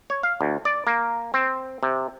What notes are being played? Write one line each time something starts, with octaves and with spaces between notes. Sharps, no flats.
C#5
F5
D2
D5
A#3
C4
C3